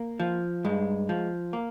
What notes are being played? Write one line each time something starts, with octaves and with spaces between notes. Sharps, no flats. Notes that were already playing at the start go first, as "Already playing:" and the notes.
Already playing: A#3
F3
G2 G#3
F3
A#3